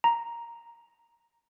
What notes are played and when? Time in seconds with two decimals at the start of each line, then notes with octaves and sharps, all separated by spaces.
0.04 A#5